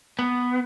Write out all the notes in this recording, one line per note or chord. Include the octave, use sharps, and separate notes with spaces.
B3